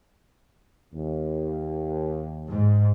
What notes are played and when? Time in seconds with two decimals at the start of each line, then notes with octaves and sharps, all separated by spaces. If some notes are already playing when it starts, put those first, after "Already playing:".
0.93 D#2
2.49 G#2